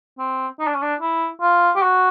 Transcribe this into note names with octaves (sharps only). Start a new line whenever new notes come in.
C4
D#4
D4
C#4
D4
E4
F4
G4
F#4